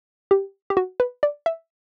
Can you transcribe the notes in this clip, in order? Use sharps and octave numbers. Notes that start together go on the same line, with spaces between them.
G4
G4
F#4
B4
D5
E5